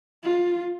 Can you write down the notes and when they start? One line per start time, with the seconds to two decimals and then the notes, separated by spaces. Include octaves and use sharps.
0.24 F4